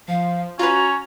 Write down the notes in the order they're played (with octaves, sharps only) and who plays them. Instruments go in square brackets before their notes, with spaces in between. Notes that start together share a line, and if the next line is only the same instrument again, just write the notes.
[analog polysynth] F3 [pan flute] F5
[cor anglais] C#4 [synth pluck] F4 B4 [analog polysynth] F#4 [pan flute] A#5